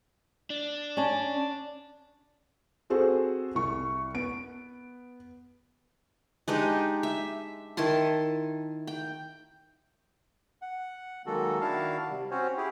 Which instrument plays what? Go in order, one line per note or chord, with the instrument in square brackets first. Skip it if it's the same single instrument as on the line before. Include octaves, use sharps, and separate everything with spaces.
[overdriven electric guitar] D4
[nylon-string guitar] C#4 D5 A5
[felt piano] C4 F#4 G#4 A4 C5
C2 C#6
B3 D7
[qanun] G#3 D4 D#4 G4
E5
D#3 E4 A5 C6
G5
[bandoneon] F#5
D#3 F#3 G#3 A#3 F#4 A4
D#3 D4 E4 F#4 F5 A5
C3 G3
C4 C#4 F#4 C5 C#5
E4 G4 G#4